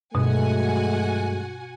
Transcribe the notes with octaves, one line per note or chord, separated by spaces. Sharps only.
G2 B2 F#3 G#3 A3 F#4 F#5 G#5